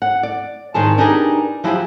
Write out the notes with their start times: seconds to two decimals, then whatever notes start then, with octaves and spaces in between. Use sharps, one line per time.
0.02 F#5
0.23 D5
0.74 G#2 D#3 G#3 G#4 A5
0.98 D4 D#4 G4 G#4 A#4 B4
1.64 F3 F#3 E4 F4 G4 G#4